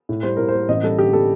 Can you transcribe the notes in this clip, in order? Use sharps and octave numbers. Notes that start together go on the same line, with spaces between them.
A2
G3 C5
A2 A#4
A#3 C5
A1 D#5
G3 A4
D3 G4
G3 A4